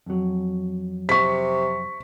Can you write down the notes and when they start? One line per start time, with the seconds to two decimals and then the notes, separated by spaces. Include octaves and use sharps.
0.06 F2 F#3
1.09 C3 C#6 B6